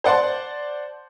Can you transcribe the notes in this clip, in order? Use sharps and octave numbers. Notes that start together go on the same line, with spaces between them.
C5 D5 F#5 A5 C6